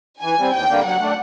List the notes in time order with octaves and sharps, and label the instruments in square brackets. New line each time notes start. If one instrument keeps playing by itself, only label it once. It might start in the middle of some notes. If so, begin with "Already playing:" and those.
[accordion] E3 [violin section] G#5
[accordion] G3 C4
[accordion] D#2 [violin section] G5
[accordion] D3 G3 A#3
[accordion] F#3 [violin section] F#5
[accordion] A3 D4